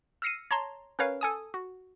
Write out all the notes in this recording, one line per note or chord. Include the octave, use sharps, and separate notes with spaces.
E6 F6 A#6 C7 C#7 D#7
C#5 A5 A#5 C6
C#4 A#4 B4 C#5 F5
A4 G#5 D#6
F#4